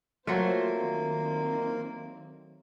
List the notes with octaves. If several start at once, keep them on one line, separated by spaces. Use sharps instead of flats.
F#3 A3 A#3 F4 C5
D#3 C4